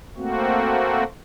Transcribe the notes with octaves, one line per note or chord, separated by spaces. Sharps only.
A3 A#3 C4 F#4